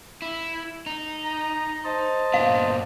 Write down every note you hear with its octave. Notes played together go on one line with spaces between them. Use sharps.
E4
D#4
A#5
C5 D#5 A5
G2 A#2 B3 F5